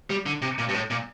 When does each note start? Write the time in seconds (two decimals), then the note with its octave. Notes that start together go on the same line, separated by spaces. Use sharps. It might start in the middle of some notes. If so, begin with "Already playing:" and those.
0.10 G3
0.26 D3
0.42 C3
0.59 A#2
0.69 G2
0.74 A2
0.90 A#2